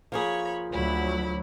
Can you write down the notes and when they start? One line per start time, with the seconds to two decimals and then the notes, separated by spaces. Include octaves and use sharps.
0.12 F3 A#3 G#4 C#5 B5
0.72 D2 F#3 E4 B5